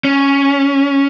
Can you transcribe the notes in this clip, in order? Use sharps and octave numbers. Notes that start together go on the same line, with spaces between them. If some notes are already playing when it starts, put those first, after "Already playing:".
C#4